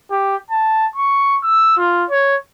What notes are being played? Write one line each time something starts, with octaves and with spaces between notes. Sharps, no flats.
G4
A5
C#6
E6
F4
C#5